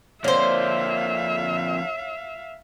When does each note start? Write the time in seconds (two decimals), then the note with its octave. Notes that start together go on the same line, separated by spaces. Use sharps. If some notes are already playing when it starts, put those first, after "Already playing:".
0.24 F2 D3 A#3 C5 C#5 E5 F5